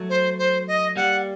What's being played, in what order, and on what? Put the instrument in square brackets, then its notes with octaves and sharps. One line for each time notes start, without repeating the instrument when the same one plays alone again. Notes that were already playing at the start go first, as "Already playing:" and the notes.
Already playing: [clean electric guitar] F#3 A3
[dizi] C5
C5
D#5
[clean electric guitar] G3 A#3 [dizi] F#5